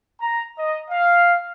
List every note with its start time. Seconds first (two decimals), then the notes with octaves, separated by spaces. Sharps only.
0.21 A#5
0.58 D#5
0.91 F5